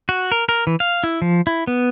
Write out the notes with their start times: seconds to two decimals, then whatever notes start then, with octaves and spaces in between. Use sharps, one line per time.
0.09 F#4
0.32 A#4
0.49 A#4
0.67 E3
0.80 F5
1.04 E4
1.22 F3
1.47 E4
1.67 B3